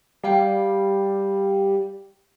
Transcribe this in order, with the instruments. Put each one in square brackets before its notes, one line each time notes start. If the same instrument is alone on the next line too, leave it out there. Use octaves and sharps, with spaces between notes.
[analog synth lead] G3 [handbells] G4 F5 G5